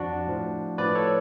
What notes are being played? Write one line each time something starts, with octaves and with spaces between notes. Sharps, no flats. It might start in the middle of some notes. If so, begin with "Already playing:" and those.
Already playing: F2 F3 D4 F#4
A2 F3
A2 F3 B4 D5
A4 C#5